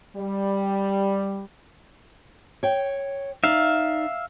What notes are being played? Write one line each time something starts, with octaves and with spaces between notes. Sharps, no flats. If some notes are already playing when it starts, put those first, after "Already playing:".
G3
C#5 G5
D#4 D5 E5 F5